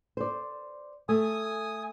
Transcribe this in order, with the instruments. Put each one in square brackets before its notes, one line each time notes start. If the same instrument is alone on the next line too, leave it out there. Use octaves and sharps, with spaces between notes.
[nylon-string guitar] C5 D5
[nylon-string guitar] A3 [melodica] G#5 D#6